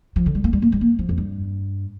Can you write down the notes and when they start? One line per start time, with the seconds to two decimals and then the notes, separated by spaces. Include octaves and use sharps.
0.16 F3
0.26 D3
0.35 G3
0.44 A#3
0.53 G3
0.62 A#3
0.72 G3
0.81 A#3
0.99 F3
1.09 F2
1.18 G2